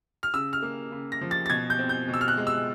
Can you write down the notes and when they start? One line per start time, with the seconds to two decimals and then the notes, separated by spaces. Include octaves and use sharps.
0.23 F6
0.34 C#3 E6
0.53 F6
0.62 A#3
0.92 C#3
1.12 A#6
1.21 F3
1.31 A6
1.46 A6
1.50 B2 G#6
1.70 G6
1.79 C4
1.89 G6
2.08 B2
2.14 E6
2.21 F6
2.28 F#6
2.37 G#3
2.47 E6